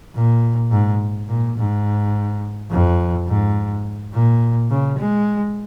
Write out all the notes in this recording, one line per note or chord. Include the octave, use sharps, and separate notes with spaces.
A#2
G#2
A#2
G#2
F2
G#2
A#2
C#3
G#3